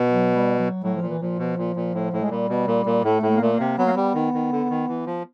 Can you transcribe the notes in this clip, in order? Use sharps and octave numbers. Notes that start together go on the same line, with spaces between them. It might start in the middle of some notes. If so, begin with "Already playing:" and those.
Already playing: B2
F#3
G3
F#3
A2 F#3
F3
A#2
E3
A#2 F3
B2
A#2
A#2
A2
A2
G#3
A#2 G3
B2
A#2
A#2
A2 A3
A2
A3
A#3
A#2 A3
A#3
C3
F#3 B3
A#3
G3 B3
D#3
D#3
D3
D#3
E3
F3